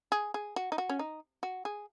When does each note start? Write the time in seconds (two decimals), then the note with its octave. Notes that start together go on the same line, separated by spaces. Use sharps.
0.12 G#4
0.34 G#4
0.56 F#4
0.72 D#4
0.78 F#4
0.89 C#4
0.99 D#4
1.43 F#4
1.65 G#4